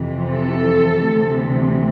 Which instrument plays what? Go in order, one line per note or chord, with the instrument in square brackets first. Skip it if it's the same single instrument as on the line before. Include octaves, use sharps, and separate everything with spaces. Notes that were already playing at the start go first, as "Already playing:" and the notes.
Already playing: [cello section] F2 C3 E3
A4
D2 C3 E3